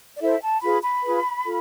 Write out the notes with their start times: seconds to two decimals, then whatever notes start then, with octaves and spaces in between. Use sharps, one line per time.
0.16 D5
0.21 E4 A4 C5 E5
0.42 A5
0.62 F4 G#4 B4 B5
0.82 B5
1.03 F4 G#4 B4
1.45 F4 A4